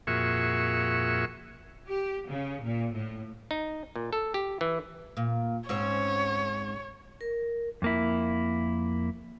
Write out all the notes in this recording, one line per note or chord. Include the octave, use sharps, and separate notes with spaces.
F2 A#2 F#4 G#4 E5 C#6
G4
C#3
A#2
A2
D#4
A#2
A4
G4
E3
A#2
G#2 C4 C#4 C#5
A#4
F2 A#3 E4